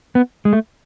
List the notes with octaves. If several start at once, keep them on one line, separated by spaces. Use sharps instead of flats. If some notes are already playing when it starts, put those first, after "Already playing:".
B3
G#3
A3